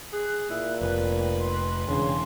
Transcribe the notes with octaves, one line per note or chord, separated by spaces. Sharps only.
G#4 F#6
A#2 E4
F1 B4
C6
E1 C#3 D4 C6